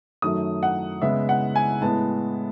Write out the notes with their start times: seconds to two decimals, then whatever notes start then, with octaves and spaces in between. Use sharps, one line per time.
0.22 F#2 D#3 F#3 A3 D#6
0.63 F#5
1.02 C#3 G#3 B3 E5
1.29 F#5
1.56 G#5
1.81 A2 G#3 B3 A5